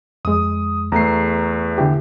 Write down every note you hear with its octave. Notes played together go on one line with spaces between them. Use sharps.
F2 G#3 D#6
E2 A3 A#5 C7
D3 E4 G4